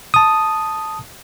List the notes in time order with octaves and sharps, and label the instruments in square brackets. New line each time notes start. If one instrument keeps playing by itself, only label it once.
[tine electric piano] A5 D#6